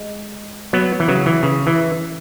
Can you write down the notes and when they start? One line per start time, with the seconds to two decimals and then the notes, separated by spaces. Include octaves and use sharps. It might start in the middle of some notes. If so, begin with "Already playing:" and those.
Already playing: G#3
0.73 F#3 B3
1.00 E3
1.08 C#3 F#3
1.26 E3
1.43 C#3
1.67 E3